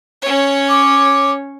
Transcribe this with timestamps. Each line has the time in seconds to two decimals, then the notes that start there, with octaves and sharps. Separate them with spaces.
0.22 C#4 C#5
0.69 D6